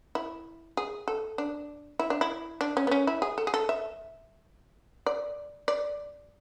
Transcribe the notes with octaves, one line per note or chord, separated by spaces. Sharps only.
E4
G#4
A4
D4
E4
D4
E4
D4
C#4
B3
C#4
E4
G#4
A4
G#4
A4
E5
D5
D5